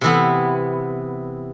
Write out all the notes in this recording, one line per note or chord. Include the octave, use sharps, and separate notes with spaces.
C3 E3 B3 E4